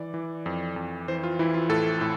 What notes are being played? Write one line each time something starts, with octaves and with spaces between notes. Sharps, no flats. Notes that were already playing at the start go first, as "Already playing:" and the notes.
Already playing: E3 D5
E3
F2
F2
E3 C5
F4
E3 E4
F4
A2 A4
A2